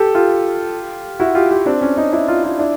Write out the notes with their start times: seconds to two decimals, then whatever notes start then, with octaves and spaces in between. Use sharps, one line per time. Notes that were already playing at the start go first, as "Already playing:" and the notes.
Already playing: G4 A4
0.15 F4 G4
1.20 E4 F#4
1.35 F4 G4
1.51 F4 G4
1.66 C4 D4
1.81 C#4
1.97 C#4 D#4
2.13 D4 E4
2.28 D#4 F4
2.44 D#4 F4
2.59 D4 E4